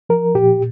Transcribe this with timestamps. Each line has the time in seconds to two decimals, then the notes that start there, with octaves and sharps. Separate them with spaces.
0.09 F3 A#4
0.34 A#2 G4